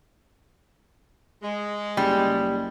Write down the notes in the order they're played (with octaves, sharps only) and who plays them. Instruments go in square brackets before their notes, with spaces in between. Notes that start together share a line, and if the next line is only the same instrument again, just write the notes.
[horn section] G#3
[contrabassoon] F#1 [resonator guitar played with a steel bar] G3